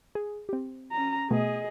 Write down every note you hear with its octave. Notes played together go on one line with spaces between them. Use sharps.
G#4
C4 G4
C#4 A#5
B2 A3 B3 G#4 D#5